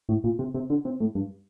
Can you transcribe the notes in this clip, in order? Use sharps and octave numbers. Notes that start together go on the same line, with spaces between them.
A2
A#2
C3
C3
D3
C3
A2
G2